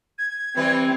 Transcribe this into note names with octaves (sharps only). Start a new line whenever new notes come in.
G#6
E3 G3 C4 B4